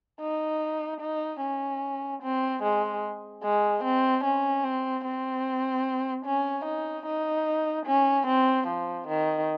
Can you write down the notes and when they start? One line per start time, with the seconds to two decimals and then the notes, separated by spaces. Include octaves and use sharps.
0.21 D#4
1.01 D#4
1.42 C#4
2.22 C4
2.63 G#3
3.44 G#3
3.84 C4
4.25 C#4
4.64 C4
5.05 C4
6.26 C#4
6.66 D#4
7.06 D#4
7.86 C#4
8.27 C4
8.67 F3
9.08 D#3